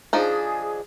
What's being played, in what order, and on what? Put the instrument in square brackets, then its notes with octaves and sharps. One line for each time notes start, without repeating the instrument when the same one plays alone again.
[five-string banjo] F3 D4 D#4 [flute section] G#4